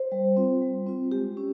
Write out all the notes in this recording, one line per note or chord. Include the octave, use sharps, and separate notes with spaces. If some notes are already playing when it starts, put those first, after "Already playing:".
Already playing: C5
G3
C4 F4
G3
C4 F4
G#3 G4
C#4